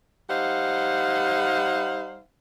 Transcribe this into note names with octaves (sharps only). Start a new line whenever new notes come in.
G3 D#4 C5 F5 F#5